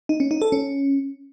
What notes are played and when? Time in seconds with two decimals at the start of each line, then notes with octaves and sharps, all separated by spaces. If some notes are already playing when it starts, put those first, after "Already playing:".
0.09 D#4
0.20 C#4
0.31 D#4
0.42 A4
0.52 C#4